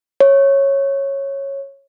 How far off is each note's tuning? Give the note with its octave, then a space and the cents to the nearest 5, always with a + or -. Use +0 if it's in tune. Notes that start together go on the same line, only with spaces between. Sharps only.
C#5 -10